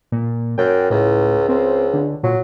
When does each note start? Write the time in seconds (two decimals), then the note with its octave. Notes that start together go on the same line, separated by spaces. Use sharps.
0.12 A#2
0.58 F#2 G5
0.90 C#2 A2
1.48 C#2 C4
1.94 D3
2.23 A#2 F#3